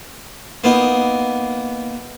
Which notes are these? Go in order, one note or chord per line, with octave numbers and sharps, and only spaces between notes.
A#3 B3 D#4